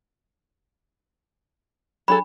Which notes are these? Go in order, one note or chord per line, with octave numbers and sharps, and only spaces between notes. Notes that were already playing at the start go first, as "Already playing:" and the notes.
F#3 D4 G#4 A4 B5